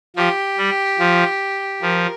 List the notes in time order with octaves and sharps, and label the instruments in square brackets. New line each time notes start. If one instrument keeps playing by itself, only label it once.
[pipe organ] F3 [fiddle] G4
[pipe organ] G3
F3
[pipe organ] F3 [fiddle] A#4